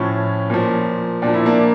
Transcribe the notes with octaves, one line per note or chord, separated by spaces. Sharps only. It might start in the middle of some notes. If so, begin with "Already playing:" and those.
Already playing: A2 F3 C#4 E4
A#2 F3
A#2 D4
F3
E4
A#3 D4